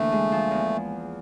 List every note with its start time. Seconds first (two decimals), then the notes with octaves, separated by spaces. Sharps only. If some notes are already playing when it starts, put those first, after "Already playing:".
Already playing: D2 E3 A3 A#3 D4
0.12 G#3
0.32 F3
0.51 E2